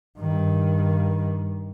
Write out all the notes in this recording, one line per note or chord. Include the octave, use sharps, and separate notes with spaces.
G2 D#3